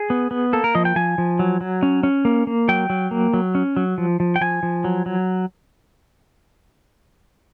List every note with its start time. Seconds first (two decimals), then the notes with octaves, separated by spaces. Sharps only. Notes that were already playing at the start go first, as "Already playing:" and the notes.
Already playing: G#4
0.10 B3
0.31 B3
0.53 A#3 A4
0.64 A#4
0.75 F3 D#5
0.85 G5
0.96 F3 G#5
1.18 F3
1.39 F#3
1.61 F#3
1.83 C#4
2.03 C#4
2.25 A#3
2.47 A#3
2.69 F#3 G5
2.90 F#3
3.11 A#3
3.34 F#3
3.55 C#4
3.77 F#3
3.98 F3
4.20 F3
4.36 G5
4.41 F3 G#5
4.63 F3
4.84 F#3
5.06 F#3